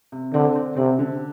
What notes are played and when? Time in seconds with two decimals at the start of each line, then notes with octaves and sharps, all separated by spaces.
0.12 C3
0.33 D3 C4
0.56 C4
0.77 C3 C4
0.99 D3